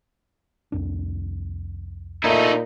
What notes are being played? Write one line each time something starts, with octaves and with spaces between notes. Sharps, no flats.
C2 F2 D4
A#2 A3 D#4 E4